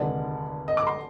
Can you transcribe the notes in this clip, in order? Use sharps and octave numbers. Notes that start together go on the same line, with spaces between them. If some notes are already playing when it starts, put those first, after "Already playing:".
Already playing: F1 D#2 D3 G#3 D4 D5
D#5
D6
C6